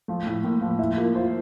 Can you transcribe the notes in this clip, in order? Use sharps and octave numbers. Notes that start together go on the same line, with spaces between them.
F3 A3
A2
A2 A#3
F3
E4 E5
A#3 F4
F4 C5